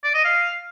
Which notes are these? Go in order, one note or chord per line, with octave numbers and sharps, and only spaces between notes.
D5
D#5
F5